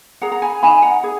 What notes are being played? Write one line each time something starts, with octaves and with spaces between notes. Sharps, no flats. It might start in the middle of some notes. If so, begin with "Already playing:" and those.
G#4 F#5 A#5
A#5
G#5 B5
D#4 G#5 B5
F#5 A#5
G#4